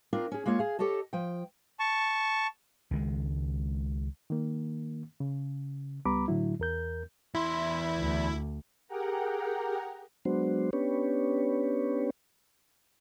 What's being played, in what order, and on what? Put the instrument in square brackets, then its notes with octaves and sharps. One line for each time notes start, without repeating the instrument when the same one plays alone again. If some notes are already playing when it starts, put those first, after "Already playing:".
[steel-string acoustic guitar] C4 D4 F4 A#4
C#4 G#4
G#3 A#3 F4 C#5
G#4 F5
G4 A4 C#5 D#5 A5
F3 G5
[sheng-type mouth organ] A5 C#6
[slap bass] C#2 D#3 F#3 G#3
[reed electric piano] D#3 A#3
C#3
C#2 G3 B3 A#5 B5 D6
A2 D3 F#3 E4
E2 A#4 G6
[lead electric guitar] E2 C6 [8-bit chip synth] E4
[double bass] D2
[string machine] G4 G#4 A#4 F#5 G5 A#5
[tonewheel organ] F#3 G#3 B3 D4 F#4 C5
B3 C#4 D4 G4 B4 C#5